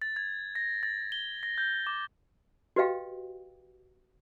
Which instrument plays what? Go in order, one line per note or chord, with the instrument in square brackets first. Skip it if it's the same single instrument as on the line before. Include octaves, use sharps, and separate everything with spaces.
[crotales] A6
G#6
A#6
A6
G7
A#6
G6
D6
[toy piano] F#4 G4 B4 D#5 F5 G5